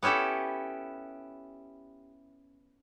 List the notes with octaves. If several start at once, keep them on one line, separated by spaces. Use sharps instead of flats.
B3 C#4 E4 G4 A4